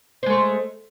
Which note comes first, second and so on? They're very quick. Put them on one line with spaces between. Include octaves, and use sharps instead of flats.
C5 G#3 A3